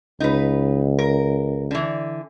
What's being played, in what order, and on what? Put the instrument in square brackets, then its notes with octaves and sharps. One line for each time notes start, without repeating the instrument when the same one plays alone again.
[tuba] C#2 [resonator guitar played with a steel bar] D#4 B4
[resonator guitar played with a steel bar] A#4
D3 E3